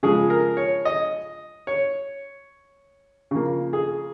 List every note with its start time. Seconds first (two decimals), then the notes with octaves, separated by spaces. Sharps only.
0.03 C#3 F3 G#3 G#4
0.30 A#4
0.57 C#5
0.85 D#5
1.67 C#5
3.31 C#3 F3 A#3
3.73 G#4